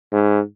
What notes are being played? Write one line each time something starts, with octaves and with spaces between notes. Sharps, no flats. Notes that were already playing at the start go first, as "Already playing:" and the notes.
G#2